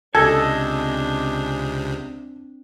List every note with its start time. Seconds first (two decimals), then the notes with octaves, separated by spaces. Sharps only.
0.15 C#2 C3 C4 D4 A4 D#5 G#5